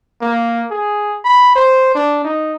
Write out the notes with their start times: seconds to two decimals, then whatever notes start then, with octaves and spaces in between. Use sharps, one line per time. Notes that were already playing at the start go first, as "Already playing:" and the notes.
0.21 A#3
0.71 G#4
1.25 B5
1.55 C5
1.95 D4
2.24 D#4